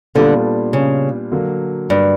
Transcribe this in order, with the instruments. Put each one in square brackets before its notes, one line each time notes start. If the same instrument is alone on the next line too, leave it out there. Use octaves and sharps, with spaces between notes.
[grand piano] A#2 G3 B3 D4 F4 [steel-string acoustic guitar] D3
[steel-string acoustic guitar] C#3
[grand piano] D3 F#3 A#3
[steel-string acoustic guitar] G2